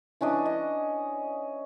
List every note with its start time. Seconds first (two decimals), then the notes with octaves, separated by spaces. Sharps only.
0.21 E3 C#4 D4 D#5
0.45 D#5